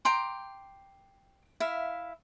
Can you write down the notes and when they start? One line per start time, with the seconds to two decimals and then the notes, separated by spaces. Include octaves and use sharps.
0.05 G5 A#5 C6 D6
1.60 E4 E5 F5